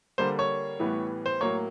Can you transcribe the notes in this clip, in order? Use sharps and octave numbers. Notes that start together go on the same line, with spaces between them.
D3 G3 A#3 C5
C#5
A2 E3 G3 B3
C5
A2 F#3 A#3 C#5